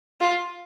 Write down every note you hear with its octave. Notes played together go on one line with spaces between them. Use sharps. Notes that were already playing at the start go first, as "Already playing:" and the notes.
F4